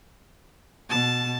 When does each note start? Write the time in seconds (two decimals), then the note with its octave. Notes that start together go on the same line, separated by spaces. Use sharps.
0.90 B2 A5